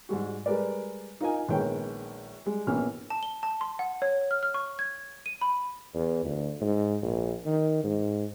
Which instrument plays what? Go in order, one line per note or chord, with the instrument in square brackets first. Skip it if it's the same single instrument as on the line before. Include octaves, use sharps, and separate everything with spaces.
[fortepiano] G#2 G3 G#3 F#4
G3 G#3 A#4 B4 D5
D#4 F4 A#4 D#5 G#5
A#1 D#3 G#3 B3 C#5 G5
G3 G#3
A#1 B2 E3 A#3 C#4 F6
[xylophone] A5
G7
A5
C6
F#5
C#5
F6
F6
C#6
G#6
D#7
B5
[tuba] E2
D2
G#2
A#1
D#3
G#2